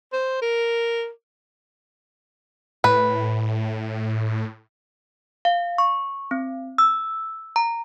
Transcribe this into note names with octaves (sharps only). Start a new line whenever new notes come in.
C5
A#4
A2 B4
F5
C#6
C4
E6
A#5